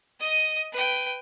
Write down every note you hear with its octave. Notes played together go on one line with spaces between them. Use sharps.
D#5 D#6
B4 G5